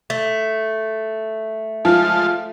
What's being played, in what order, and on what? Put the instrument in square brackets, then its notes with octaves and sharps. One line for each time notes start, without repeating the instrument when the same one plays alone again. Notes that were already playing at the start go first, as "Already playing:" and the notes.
[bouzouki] A3
[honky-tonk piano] F3 [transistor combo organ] G#3 F4 A5